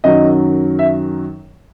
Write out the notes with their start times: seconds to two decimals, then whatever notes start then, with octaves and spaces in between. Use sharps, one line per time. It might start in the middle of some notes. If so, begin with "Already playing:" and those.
0.04 F#2 D#3 F#3 D#5
0.79 E5